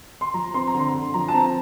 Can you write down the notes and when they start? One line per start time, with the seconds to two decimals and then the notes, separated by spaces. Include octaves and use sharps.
0.21 C6
0.34 F3 A#5
0.54 C4 C6
0.67 A#5
0.74 D3
0.79 C6
0.95 D3
1.14 F3 A#5
1.28 A5
1.34 C4 A#5